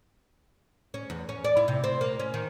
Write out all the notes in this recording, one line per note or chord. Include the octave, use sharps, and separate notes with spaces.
C#4
E2
C#4
D5
E4
C3
C4
A#3
C#4
D#3